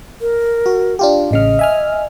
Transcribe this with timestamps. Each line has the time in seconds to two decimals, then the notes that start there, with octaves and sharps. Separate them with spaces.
0.21 A#4
0.66 F#4
0.99 D4 F4 G4
1.31 A1 C#3 D#5 F6
1.59 E5 G#5 F6